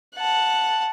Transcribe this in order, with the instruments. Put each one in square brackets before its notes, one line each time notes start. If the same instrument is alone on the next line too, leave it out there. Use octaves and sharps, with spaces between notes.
[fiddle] F#5 A5